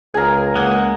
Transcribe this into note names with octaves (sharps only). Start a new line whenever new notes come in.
C#2 G#4 A#4 G#5
G#3 A#3 F#5